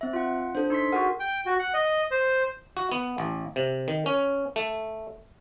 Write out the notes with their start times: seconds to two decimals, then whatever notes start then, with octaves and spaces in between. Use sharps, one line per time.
0.01 C4 E5
0.13 F4 F#5
0.55 D4 A4 C5
0.70 D#4 C6 B6
0.93 F#4 G#4 A#4 F#5
1.20 G5
1.46 F#4
1.59 F#5
1.74 D#5
2.11 C5
2.77 F#4
2.92 B3
3.18 A1
3.56 C3
3.88 D#3
4.06 C#4
4.56 A3